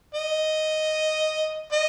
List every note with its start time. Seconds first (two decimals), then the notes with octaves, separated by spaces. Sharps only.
0.14 D#5
1.72 D#5